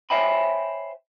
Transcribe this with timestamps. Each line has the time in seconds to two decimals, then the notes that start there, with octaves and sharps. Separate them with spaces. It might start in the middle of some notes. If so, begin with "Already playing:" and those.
0.10 C5 C#5 E5 G5 G#5 B5